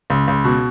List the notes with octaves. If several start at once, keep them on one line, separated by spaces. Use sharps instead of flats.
C#2
C#2
B2